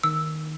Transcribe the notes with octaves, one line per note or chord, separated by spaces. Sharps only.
D#3 E6